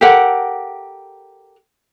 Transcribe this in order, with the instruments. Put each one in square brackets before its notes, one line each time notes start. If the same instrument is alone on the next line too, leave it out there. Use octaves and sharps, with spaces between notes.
[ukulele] G4 A4 A#4 F#5